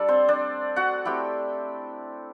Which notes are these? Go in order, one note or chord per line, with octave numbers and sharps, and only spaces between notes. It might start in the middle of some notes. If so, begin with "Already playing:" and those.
Already playing: G3 A3 D4 A4 D5 A5
C4 C5
D4 D5
F#4 F#5
A3 C4 E4 G4 G5